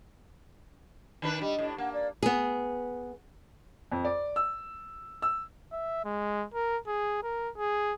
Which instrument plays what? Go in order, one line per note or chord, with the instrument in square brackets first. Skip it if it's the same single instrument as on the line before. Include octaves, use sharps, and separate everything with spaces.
[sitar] D#3 D4 B4
[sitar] G3 [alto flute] D#5
[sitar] A2 D4
[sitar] A#3 [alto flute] F#5
[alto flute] D5
[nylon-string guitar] B3 G#4
[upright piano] F2
D5
E6
E6
[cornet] E5
G#3
A#4
G#4
A#4
G#4